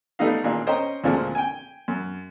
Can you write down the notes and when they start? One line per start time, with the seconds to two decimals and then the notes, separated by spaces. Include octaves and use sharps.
0.19 G3 A3 B3 D#4 F5
0.44 G#1 A#2 D4 F5
0.67 C#4 C5 D#5 G5 A#5
1.04 D2 A#2 F3 G#3 D4
1.35 G5 G#5
1.88 F#2